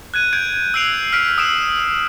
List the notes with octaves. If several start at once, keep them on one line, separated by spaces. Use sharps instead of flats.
F#6 G#6 D#7
G6 G#6 D7
E6 F#6 C7 D7 F7
F6 B6 D7
D#6 E6 D7 E7